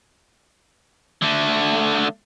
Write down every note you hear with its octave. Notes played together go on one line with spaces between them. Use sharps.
D3 A3